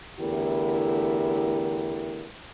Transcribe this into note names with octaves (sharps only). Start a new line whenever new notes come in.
E2 D3 A3 E4 G4 A#4